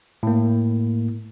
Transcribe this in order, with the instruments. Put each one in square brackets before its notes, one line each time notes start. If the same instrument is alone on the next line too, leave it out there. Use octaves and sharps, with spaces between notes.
[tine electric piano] A2 A#3